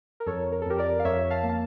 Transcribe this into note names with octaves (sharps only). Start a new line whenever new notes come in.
A#4
F2 A4 C#5
A#4
A4
F2 G4 A#4
A#4 D5
F5
F2 C#5 E5
F5 A5
A#3
A5